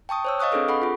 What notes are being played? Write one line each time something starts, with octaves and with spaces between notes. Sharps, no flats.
G5 A5 C#6 D#6
C5 C#5 E6
D#5 F5 C#6 D#6 F#6
C4 D4 G#4 A4 B4
A4 F#5 B5 C#6
F4 G#4